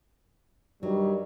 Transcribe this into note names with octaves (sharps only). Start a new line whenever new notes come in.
G2 D#3 F#3 G3